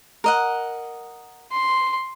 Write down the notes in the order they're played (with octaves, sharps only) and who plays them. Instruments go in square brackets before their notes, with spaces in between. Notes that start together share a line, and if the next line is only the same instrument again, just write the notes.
[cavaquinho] A#4 D#5 F#5
[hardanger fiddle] C6